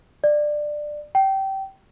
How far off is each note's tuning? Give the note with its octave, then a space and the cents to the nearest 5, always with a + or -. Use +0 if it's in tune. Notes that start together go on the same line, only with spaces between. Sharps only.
D5 +15
G5 -20